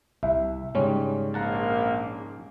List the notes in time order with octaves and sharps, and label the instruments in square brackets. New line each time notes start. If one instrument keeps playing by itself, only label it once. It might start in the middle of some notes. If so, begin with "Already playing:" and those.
[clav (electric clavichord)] C2 [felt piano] E5
[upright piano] G#2 C#3 [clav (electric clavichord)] G3 C#4 [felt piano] C#5
[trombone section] A#1 A#3 [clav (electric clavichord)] A#4 F#5 A5